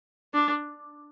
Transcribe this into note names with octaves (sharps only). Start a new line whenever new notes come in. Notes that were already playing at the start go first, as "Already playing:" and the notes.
D4